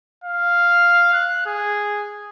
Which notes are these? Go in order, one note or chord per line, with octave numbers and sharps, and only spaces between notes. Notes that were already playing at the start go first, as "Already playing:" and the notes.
F5
F#6
G#4